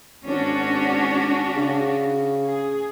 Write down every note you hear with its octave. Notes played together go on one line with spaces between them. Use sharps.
G#1 C#4 D4 F#4
C#3
G#4